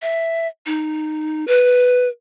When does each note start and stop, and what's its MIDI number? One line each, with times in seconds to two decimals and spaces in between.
0.02 0.47 76
0.66 1.45 63
1.47 2.08 71